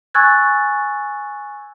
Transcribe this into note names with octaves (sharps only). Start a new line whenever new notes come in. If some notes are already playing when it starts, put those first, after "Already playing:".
G#5 C#6 E6 F#6 G#6 A6